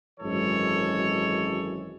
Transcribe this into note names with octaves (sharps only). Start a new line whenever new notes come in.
G#1 F#2 E3 G#3 A4 C#5